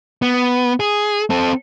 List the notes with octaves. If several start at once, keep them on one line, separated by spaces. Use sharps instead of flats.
B3
G#4
C4 A4